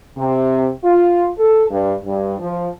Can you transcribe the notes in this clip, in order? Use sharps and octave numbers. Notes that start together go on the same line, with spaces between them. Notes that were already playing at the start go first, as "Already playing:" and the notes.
C3
F4
A4
G2
G2
F3